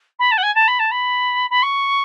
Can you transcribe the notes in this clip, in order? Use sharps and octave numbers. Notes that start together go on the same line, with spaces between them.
B5
A5
F#5
G#5
A5
B5
A5
B5
B5
C#6